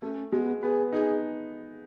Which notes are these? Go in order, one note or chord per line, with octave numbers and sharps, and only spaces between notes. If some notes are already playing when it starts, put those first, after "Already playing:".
A3 C#4
G#3 B3
B3 G#4
D#4 G#4